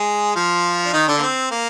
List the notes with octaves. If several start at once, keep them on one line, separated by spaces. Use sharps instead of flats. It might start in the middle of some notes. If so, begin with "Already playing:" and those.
Already playing: G#3 G#4
F3 F4
D4
D#3 D#4
D3 D4
A#3
C4
A#3